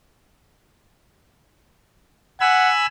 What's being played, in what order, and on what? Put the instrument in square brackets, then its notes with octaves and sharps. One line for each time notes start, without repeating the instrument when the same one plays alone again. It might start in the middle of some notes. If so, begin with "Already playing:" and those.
[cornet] F#5 [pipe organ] G#5 B5 E6